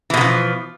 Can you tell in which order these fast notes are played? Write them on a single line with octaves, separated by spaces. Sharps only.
E3 B2 D3 F3